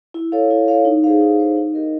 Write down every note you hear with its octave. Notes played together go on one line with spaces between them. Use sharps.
E4
A4 C#5 F5
E4
A4 C#5 F5
D#4
G#4 C5 F5
D#4
G#4 C5 F5
D#4
G4 A#4 D#5